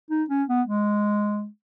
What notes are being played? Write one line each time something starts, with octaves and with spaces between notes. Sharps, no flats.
D#4
C#4
B3
G#3